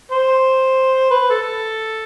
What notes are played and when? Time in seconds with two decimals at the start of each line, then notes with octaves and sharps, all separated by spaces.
0.11 C5
1.11 B4
1.30 A4